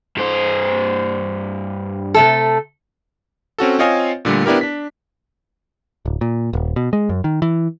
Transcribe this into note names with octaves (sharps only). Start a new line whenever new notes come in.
G2 C5
C3 A3 A4
C4 C#4 F#4 A4
C4 F4 C#5 D#5 F5 G#5
A#2 D3 G3 A3
B3 D4 E4 G4 A#4
D4 B6
D1
A#2
D#1
B2
G#3
F#2
D#3
E3